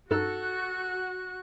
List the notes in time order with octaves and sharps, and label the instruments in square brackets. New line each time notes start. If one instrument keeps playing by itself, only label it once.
[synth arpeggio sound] G2 D#4 E6 [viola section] F#4 [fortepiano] A4 [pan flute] F#6